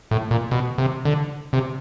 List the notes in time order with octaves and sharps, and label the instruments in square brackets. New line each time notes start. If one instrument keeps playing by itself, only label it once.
[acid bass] A2
A#2
B2
C3
D3
C3